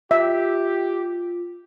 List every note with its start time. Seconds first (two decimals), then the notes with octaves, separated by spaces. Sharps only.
0.11 F4 G4 E5